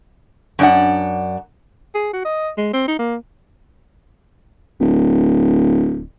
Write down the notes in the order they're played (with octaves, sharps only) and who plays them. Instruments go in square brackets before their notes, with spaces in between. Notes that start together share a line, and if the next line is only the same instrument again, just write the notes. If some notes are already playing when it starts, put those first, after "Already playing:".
[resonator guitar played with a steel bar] F#2 D4 F#5
[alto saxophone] G#4
F#4
D#5
G#3
C4
D#4
A#3
[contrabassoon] D1